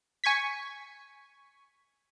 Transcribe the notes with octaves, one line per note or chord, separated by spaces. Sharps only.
G#5 C#6 G#6 B6